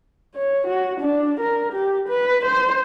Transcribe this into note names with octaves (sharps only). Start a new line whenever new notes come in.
C#5
F#4
D4
A#4
G4
B4
C5